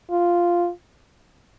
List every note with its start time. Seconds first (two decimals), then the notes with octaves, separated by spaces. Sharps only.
0.11 F4